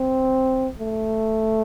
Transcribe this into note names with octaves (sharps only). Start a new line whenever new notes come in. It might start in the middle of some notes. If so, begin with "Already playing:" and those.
Already playing: C4
A3